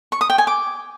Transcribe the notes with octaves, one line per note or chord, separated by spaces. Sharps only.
C#6
D#6
G5
G#5
D6